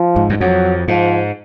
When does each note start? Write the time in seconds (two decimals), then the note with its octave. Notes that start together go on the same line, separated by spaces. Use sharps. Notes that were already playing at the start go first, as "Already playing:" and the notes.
Already playing: F3
0.16 G#2
0.30 F#2
0.41 F2 F#3
0.88 G#2 F3